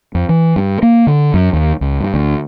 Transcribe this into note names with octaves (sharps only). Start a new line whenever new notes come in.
F2
E3
G2
A#3
D3
F#2
D#2
C#2
G2
D2